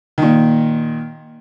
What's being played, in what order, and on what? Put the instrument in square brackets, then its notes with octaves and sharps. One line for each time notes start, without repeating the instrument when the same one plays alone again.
[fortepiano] A#2 D#3